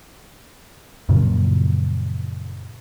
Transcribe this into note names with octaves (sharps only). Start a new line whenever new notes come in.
F#2 A#2 C#3 F3